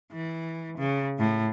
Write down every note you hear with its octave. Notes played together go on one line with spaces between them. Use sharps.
E3
C#3
A2